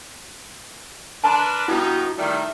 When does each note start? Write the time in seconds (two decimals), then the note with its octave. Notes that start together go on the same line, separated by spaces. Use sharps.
1.24 D4 A#4 B4 A5 A#5 C6
1.68 G2 B3 D#4 E4 F#4
2.18 D#3 G3 A3 E5